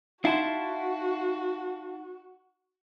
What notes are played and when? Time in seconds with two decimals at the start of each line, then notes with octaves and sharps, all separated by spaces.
0.25 D#4 E4 F#4 F5 F#5 A5 C6